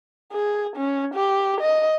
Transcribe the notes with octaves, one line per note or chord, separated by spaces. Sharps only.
G#4
C#4
G4
D#5